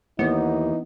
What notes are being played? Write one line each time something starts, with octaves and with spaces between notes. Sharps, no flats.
D#2 E3 B3 D#4